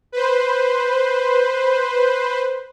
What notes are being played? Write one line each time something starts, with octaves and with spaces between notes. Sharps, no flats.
B4 C5